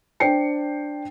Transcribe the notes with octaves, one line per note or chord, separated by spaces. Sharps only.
D4 C5 G5 C7 C#7